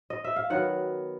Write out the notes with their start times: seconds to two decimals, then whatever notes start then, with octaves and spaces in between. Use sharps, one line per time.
0.10 D#5
0.24 E5
0.36 F5
0.50 D#3 F#3 B3 F#5